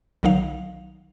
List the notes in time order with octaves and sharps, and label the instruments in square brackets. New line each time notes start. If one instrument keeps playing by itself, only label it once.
[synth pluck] B1 D3 D#3 F#3 D#4 F5